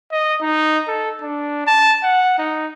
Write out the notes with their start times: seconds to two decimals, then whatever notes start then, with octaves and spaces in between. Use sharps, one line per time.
0.12 D#5
0.41 D#4
0.88 A4
1.21 D4
1.67 A5
2.03 F#5
2.39 D#4